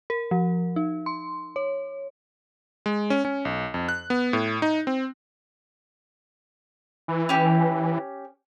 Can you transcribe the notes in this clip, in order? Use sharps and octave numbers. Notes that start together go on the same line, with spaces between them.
A#4
F3
D#4
C6
C#5
G#3
C#4
C#4
B1
F2
F#6
B3
A2
D#4
C4
E3
C#4 G4